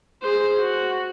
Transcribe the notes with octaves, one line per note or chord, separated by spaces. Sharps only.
G#4 C5
F#4